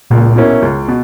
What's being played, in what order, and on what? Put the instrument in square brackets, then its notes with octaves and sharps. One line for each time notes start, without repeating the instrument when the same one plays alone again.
[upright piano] C#2 [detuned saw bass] A#2
[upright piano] B2 A#3 C#4 E4
C#2
B2